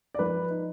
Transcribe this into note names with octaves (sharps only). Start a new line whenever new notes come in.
D5
F3 B4
D#4